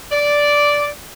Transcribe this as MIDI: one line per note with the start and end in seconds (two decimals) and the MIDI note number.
0.12 0.87 74